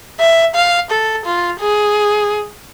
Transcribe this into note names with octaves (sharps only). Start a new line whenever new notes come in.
E5
F5
A4
F4
G#4